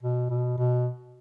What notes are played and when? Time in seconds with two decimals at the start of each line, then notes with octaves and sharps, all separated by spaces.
0.03 B2
0.30 B2
0.58 B2